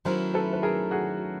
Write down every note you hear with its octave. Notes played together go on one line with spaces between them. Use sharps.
D#3 F#3 A3 C#4 E4 A#4 C5
A4 B4
B4
G#4 A#4
F#4 G#4